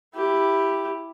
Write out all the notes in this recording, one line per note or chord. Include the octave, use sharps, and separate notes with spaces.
E4 G4